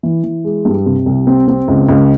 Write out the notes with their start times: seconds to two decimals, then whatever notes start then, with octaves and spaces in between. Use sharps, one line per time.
0.03 E3
0.24 E3
0.44 G#3
0.65 G2
0.86 C3
1.06 C2
1.27 C4
1.48 C4
1.68 C#2
1.89 C#2